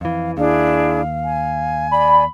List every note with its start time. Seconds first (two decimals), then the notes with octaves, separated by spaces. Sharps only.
0.01 F2 E3 F5
0.37 D#2 D4 E4 G#4 F5
1.25 G#5
1.91 D5 B5